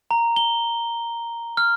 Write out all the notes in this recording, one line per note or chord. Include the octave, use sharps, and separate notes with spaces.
A#5
G7
F6